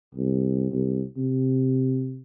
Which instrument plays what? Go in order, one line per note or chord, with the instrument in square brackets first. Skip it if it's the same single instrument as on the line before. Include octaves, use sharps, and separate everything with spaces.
[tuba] C2
C2
C3